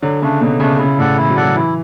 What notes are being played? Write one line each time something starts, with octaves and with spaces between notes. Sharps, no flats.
D3 F#3
C#3 A3 D4
B2 F#3
C#3 A3 D4
C#3 E4
A2 A4 D5 F#5
E3 E4
F#3
A4 D5 F#5
F#3
E3 E4